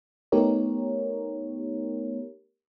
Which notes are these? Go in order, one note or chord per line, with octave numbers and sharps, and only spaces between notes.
A3 B3 D#4 G4 A#4 C#5